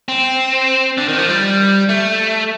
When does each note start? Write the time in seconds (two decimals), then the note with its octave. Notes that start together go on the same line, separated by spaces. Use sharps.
0.09 C4
0.98 D3
1.09 D#3
1.18 F3
1.29 G3
1.89 A3